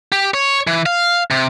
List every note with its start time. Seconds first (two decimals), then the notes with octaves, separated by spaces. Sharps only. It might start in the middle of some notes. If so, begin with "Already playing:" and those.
0.12 G4
0.34 C#5
0.67 E3
0.86 F5
1.31 C3